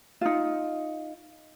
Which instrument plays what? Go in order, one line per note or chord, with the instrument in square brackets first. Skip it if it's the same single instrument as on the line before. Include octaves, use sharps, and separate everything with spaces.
[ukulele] D#4 F4